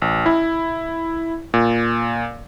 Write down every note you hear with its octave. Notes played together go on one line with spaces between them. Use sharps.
A1
E4
A#2